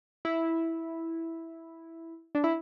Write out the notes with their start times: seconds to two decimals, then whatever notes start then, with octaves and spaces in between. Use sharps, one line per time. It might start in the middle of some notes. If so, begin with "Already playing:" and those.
0.25 E4
2.35 D4
2.44 E4